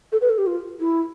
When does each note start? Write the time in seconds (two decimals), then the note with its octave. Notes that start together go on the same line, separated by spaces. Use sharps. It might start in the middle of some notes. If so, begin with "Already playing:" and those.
0.12 A4
0.21 B4
0.30 A4
0.38 G4
0.47 F4
0.80 E4